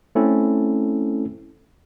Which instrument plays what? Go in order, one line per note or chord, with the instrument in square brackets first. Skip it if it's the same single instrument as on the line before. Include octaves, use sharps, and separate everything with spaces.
[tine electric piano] A3 C4 C#4 E4 A4